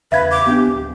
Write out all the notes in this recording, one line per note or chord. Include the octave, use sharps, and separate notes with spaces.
E2 C#3 B4 E5 F5 G#6
D6
B3 D4 G4
D1 C2